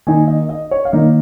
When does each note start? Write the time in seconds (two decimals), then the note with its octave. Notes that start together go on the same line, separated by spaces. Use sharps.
0.07 D#3 A#3 D#4 G#5
0.28 D#5
0.49 D#5
0.71 C#5
0.85 F5
0.92 D#3 A#3 D#4 D#5